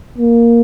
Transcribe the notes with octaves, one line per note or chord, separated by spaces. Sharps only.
A#3